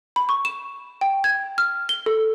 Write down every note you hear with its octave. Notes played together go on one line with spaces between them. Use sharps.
B5
C#6
E7
G5
G#6
F6
G7
A4